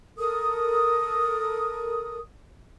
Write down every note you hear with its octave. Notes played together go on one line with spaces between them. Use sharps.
A4 A#4 D#6